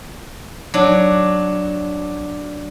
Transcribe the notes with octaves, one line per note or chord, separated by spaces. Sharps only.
F#3 D4